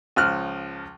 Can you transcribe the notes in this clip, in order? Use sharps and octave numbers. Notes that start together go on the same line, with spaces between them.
C#2 F3 F6 F#6